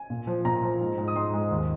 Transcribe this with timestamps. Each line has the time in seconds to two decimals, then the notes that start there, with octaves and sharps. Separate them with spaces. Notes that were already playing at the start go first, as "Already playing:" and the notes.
Already playing: G#5
0.10 A#2
0.27 F3
0.45 A#2 A#5
0.63 F3
0.80 G#2
0.98 G#2
1.08 D#6
1.16 G#2 C6
1.33 G#3
1.51 D#2